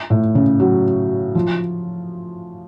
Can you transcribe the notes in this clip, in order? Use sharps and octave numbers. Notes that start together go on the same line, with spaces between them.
A2
C#3
F#3
F3